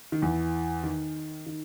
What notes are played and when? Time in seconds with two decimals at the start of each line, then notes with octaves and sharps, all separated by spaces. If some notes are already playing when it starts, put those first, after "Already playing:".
0.12 D#3
0.22 E2 E3
0.83 D#3
1.46 D#3